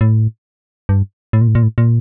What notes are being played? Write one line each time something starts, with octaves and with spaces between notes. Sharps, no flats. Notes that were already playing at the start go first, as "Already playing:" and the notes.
A2
G2
A2
A#2
A2
A#2
A2
A#2